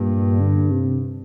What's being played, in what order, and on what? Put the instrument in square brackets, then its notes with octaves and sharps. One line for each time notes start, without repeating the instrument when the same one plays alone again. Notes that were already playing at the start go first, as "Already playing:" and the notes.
Already playing: [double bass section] G2 [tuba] A#2
[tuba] D3
C3